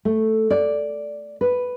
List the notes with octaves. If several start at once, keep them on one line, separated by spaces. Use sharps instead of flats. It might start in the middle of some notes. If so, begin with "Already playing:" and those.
A3
D5
B4